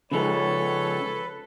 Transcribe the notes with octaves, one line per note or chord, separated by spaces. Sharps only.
C#3 F3 G#3 A4 B4 C#5